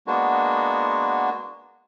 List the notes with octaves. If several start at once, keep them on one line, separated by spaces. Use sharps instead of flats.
G#3 A#3 B3 D4 F#4